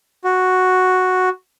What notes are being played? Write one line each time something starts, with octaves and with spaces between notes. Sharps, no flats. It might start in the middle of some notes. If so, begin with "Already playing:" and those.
F#4